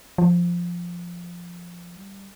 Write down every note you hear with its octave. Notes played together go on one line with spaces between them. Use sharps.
F3
G3